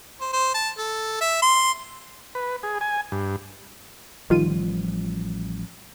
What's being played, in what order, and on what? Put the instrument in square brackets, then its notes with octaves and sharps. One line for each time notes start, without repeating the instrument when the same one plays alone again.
[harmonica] C5
C5
A5
A4
E5
C6
[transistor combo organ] B4
G#4
G#5
G2
[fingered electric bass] A1 F3 G3 [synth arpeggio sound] D#3 F4 D#7